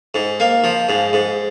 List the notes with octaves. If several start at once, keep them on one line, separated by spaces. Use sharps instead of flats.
G#2
A#3
F3
G#2
G#2